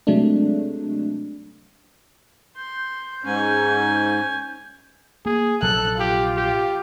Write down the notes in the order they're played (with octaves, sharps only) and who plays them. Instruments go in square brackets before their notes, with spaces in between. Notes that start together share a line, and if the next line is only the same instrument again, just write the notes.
[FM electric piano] C3 F#3 G#3 A3 D4
[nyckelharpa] C6 [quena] G6
[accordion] G#2 [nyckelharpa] C#4 G#5
[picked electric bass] A#3 [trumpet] G#4
[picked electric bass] A#1 C3 F#3 [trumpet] A4 [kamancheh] F#6
[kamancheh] F4 [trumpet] G4
[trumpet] G4